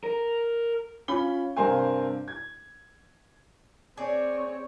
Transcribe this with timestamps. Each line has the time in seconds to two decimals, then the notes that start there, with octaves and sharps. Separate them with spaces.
0.04 A#4
1.08 C#4 F4 B5 G7
1.56 G2 C3 A#4 C5 F5 G#5
2.28 G#6
3.97 C4 G#4 C#5 D5